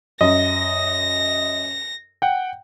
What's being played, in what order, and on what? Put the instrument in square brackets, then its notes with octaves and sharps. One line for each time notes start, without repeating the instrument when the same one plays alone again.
[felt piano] F#2 [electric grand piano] D#5 [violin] A#6
[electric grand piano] F#5 G5